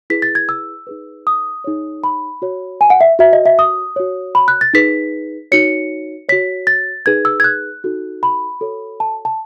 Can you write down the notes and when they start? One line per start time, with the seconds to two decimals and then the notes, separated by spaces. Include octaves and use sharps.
0.10 E4 G#4 B4 B6
0.22 A6
0.35 G#6
0.49 E6
0.87 D#4 G#4 B4
1.27 D#6
1.64 D#4 G#4 C#5
2.04 B5
2.42 F#4 C#5
2.81 G#5
2.90 F#5
3.01 E5
3.19 F#4 C#5 E5
3.33 D#5
3.46 E5
3.59 D#6
3.96 F#4 C#5
4.35 B5
4.48 F#6
4.61 A6
4.74 D#4 G#4 B4 B6
5.52 D#4 F#4 C#5 C#7
6.29 F#4 C#5 B6
6.67 A6
7.06 D#4 G#4 B4 G#6
7.25 E6
7.40 G#6
7.44 F#6
7.84 D#4 F#4 A4
8.23 B5
8.61 F#4 A4 C#5
9.00 A5
9.25 A5